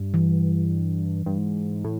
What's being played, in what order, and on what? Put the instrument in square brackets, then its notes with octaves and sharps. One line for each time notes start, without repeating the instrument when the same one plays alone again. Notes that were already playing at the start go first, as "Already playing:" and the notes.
Already playing: [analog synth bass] G2
[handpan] E3
[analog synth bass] G2
G#2
A2